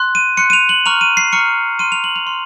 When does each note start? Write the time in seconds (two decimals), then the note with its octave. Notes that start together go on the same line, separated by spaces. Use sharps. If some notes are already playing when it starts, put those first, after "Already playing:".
Already playing: C6 F#6
0.15 D#7
0.37 C6 F#6 C#7
0.50 D#7
0.53 F7
0.69 F#7
0.86 A#5 C#6 F6 F7
1.01 D#7
1.17 C7
1.33 A#5 C#6 F6 C#7
1.79 C6 F6 D#7
1.92 F7
2.04 F#7
2.16 F7
2.27 C6